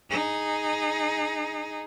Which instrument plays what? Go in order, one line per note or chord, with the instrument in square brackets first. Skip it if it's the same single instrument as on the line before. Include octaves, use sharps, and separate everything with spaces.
[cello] D#4 G#4